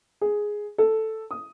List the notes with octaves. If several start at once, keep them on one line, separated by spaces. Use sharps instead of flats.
G#4
A4
D#6